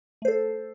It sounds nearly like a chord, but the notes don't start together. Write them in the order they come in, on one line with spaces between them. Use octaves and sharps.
A3 C5 A4